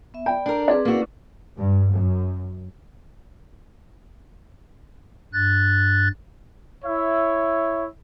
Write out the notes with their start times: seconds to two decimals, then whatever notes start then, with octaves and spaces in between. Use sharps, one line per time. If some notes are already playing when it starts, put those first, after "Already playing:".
0.14 B3 E5
0.26 D5 G5 B5
0.46 D4 A#4 D5 A#5
0.68 C4 G#4 B4 D5
0.85 A#3 C#4 E4 F#4 B4
1.57 G2
1.91 F#2
5.33 G2 F#6 A6
6.85 E4 C#5 E5